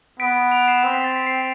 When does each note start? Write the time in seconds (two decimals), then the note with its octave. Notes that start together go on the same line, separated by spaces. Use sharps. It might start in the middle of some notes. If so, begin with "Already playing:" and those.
0.19 B3 B6 D7
0.51 D7 F7
0.67 C7 E7
0.84 C4 C7
0.94 B6
1.04 A6
1.16 B6
1.27 C7